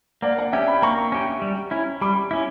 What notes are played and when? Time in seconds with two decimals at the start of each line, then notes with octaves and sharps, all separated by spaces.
0.22 A#3 D5 F#5
0.38 D5 F#5
0.53 C#4 G4 E5 G5
0.67 G5 B5
0.82 A#3 A#5 C#6
1.12 C#4 G4
1.42 G3
1.71 C#4 E4
2.01 G3 B5 D6
2.31 C#4 E4